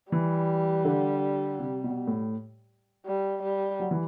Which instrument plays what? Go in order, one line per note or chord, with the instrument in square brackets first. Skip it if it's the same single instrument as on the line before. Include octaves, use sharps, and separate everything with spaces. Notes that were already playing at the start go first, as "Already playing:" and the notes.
[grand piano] E3 [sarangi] G3
[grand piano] D3
C3
B2
A2
[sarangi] G3
G3
[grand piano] F#3
E3